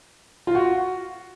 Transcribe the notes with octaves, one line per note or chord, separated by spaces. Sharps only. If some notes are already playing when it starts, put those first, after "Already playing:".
F4
F#4